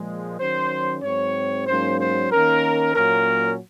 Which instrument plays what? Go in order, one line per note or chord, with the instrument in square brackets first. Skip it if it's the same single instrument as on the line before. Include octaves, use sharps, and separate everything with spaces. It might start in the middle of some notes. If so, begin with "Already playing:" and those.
Already playing: [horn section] A#2 F3 G#3
D#3 F#3 C#4 C5
G#2 F#3 C4 C#5
G#2 F#3 A#3 C#4 C5
C5
D#3 A#3 C#4 A#4
A#2 F#3 A#3 C#4 A#4